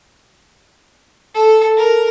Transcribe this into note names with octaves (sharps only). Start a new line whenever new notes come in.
A4
A#4